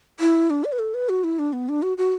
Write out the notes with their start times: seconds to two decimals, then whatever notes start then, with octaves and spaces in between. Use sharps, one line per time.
0.20 E4
0.50 D4
0.64 D5
0.72 B4
0.79 A4
0.94 B4
1.09 F#4
1.24 E4
1.39 D4
1.53 B3
1.69 D4
1.82 F#4
1.98 F#4